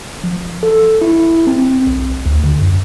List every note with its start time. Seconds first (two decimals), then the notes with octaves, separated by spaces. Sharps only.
0.24 F3
0.63 A4
1.01 E4
1.47 C4
1.87 B1
2.26 D2
2.44 D3
2.60 F#2